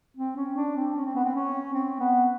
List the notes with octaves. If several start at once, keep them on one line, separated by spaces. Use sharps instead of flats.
C4
C#4
D4
C4
C#4
C4
B3
C4
C#4
C4
B3